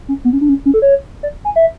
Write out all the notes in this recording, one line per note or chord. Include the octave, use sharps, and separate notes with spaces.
C#4
B3
C#4
D4
C#4
C#4
A4
C#5
D5
G#5
E5